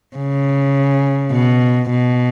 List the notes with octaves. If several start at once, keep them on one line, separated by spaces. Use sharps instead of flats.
C#3
B2
B2